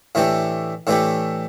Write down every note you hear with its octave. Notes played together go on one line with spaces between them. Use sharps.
A2 E3 A3 D4 G4
A2 E3 A3 D4 G4